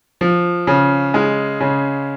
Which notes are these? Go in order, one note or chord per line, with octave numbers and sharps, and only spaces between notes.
F3
C#3
G#3
C#3